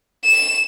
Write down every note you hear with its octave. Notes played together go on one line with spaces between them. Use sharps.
E7